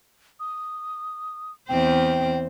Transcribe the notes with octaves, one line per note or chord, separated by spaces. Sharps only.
D#6
E2 C4 C5 G5